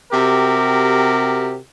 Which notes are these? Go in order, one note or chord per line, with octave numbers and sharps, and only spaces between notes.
C3 F#4 G4 A#4